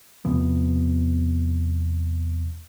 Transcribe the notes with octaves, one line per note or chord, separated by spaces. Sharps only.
E2 C3 F3 B3